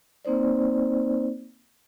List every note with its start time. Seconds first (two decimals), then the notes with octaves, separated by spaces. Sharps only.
0.25 A#3 C4 D#4 C5 D5